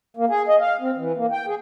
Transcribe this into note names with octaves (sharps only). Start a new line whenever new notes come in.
A#3
G#4
D#5
F5
C4
E3
A#3
G5
G#4